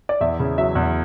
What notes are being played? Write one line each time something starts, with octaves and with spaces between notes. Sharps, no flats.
D5
E2 E5
C#3
F#3 E5
E2